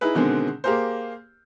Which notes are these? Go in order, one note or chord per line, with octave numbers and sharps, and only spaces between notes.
D#4 E4 G#4 B4
B2 D3 D#3 G#3 C4
A#3 G4 G#4 A#4 C5